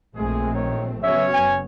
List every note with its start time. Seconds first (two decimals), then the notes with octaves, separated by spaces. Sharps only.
0.16 A#1 G#3 A3 C4 G#4
0.53 D#3 C#5
1.03 C#3 F#3 B3 C#4 C#5 E5
1.34 F#1 G#5